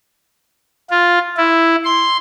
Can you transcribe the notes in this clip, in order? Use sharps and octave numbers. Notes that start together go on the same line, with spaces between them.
F4
E4
C6